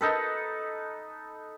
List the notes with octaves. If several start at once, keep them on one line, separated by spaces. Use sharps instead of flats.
D#4 A4 B4